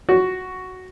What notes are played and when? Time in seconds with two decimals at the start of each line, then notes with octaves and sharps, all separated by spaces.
0.09 F#4